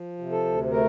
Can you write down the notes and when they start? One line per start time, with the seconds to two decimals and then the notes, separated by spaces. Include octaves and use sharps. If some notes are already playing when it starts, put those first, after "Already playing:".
Already playing: F3
0.18 C3
0.32 A4
0.45 D2
0.71 A3 A#4